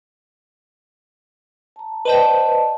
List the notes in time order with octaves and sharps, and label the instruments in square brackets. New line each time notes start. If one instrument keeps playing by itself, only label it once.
[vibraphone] A5 A#5
[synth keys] B4 C5 G5 [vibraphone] D5 D#5 A5